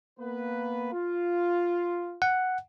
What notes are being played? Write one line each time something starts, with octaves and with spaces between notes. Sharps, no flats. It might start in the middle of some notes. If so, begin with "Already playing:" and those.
A#3 B3 B4
F4
F#5